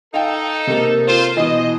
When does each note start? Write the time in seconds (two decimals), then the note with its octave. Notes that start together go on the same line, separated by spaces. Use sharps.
0.14 D#4 A4 F5 G5
0.67 C3 A#3
1.07 F4 C5
1.37 B2 E3 D#5